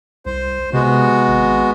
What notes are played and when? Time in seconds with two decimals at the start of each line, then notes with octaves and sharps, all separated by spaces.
0.26 C2 C5
0.73 C3 G#3 B3 F#4
1.28 G#1